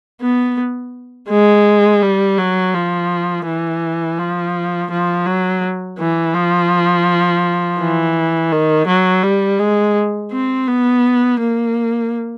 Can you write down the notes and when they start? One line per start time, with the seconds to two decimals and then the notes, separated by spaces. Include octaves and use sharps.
0.21 B3
1.29 G#3
2.02 G3
2.38 F#3
2.74 F3
3.46 E3
4.19 F3
4.91 F3
5.26 F#3
5.99 E3
6.34 F3
7.79 E3
8.52 D#3
8.87 F#3
9.23 G3
9.59 G#3
10.32 C4
10.68 B3
11.40 A#3